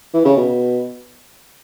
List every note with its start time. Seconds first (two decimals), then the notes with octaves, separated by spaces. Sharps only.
0.14 E3
0.25 C#3
0.36 B2